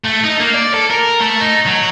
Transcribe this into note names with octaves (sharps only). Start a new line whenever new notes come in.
A3
D#4
A#3
D5
A4
A#4
A3
D#4
F#3